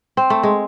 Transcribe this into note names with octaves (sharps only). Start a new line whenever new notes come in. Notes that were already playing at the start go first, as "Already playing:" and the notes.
C4
A3
G#3